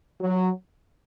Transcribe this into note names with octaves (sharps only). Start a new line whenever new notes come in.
F#3